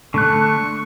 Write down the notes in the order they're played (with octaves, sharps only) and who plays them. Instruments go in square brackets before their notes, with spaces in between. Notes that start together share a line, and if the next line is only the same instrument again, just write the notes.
[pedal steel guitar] D3 A3 F#6 [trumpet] C#6